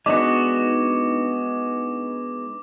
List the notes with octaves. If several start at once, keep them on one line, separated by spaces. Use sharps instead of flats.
G#3 B3 D4 D#4 F#4 D6